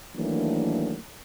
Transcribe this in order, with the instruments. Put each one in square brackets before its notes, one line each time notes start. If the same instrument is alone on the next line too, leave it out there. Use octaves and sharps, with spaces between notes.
[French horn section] D#3 E3 F#3 A3 A#3 D4